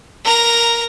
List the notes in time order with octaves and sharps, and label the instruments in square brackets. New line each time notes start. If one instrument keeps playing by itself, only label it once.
[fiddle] A#4 A#5